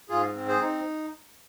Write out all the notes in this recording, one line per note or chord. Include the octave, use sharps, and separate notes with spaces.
G#2 F4 G#4
C4
G#4 C5
D#4